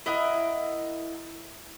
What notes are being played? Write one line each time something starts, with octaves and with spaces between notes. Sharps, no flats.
E4 A#4 D#5 F#5